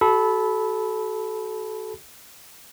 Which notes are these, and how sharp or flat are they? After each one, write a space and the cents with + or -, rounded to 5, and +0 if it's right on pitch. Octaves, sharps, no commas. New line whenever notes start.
F#4 +30 A4 -20 B5 +0